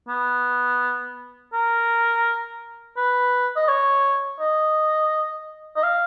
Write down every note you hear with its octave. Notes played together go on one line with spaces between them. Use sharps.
B3
A#4
B4
D#5
C#5
D#5
D#5
F5